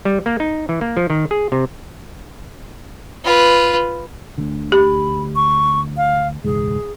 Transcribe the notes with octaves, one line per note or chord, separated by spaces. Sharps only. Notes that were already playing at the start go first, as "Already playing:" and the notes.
G3
A#3
D#4
E3
A#3
F3
D#3
G#4
C3
F4 B4
D2 D3
G4 B5
C#6
F5
E1 C#2 G#2 G#4